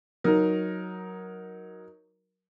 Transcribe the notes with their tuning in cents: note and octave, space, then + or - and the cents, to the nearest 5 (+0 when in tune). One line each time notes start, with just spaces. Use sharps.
F#3 +0 D#4 +10 A#4 +10